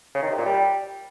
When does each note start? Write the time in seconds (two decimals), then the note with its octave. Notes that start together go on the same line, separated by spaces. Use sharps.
0.15 C#3
0.23 D#3
0.30 C3
0.38 A#2
0.46 G3